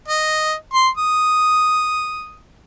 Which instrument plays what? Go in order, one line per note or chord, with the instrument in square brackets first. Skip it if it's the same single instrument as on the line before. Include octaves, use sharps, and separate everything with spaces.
[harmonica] D#5
C6
D#6